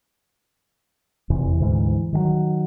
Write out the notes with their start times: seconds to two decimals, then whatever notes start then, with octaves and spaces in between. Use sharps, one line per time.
1.30 F1 E2 C3 E3
1.60 D2 G#2 E3
2.13 D#3 F3 F#3